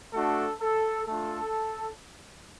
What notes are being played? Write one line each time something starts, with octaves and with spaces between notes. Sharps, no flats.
A3 D4 F#4 A4
A4
A3 D4 F4 A4